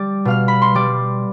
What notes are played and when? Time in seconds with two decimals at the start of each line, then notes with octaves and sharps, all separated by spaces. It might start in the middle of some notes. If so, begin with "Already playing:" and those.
Already playing: G3 D5 D6
0.25 B2 F5 F6
0.48 B5
0.62 C6
0.75 G3 D5 D6